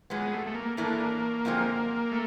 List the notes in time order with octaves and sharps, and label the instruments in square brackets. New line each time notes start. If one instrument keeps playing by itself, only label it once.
[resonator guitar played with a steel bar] A#2 F#3 B3 [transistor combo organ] G#3
[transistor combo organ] A3
A3
A#3
[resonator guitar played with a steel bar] A2 E3 A3 D4 [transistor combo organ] A#3
[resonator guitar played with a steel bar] F#2 D3 F3 G#3 C4
[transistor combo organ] A3